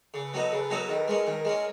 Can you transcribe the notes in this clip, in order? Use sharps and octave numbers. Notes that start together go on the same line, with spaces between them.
C#3 A4 B4
F#3 B3 D#4
C#3 G#4 A#4
F#3 B3 D#4
D#3 G#4 A#4
G#3 C#4
D#3
G#3 C#4